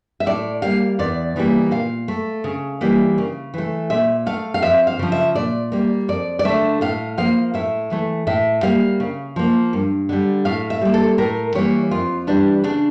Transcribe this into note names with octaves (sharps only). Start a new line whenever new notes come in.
E5
A2 D5
G3 A#3 F5
E2 D5
C#3 E3 G3 A#3
A#2 F5
A3
C#3
E3 G3 A#3
C#3
E3 A3
A#2 E5
A3 F5
F5
F2 E5
F5
C#3 F3
E5
A#2 D5
G3 A#3
F2 D5
D5
D3 A3 E5
A2 F5
F3 A#3 F5
A2 E5
E3 A3
A2 E5
G3 A#3 F5
C#3
F3 A#3
G2
D3 G3
A2 F5
E5
G3 A#3
A4
A2 A#4
E3 G3 A#3 C#5
F2 F4
E3 G3 D4
C#3 D4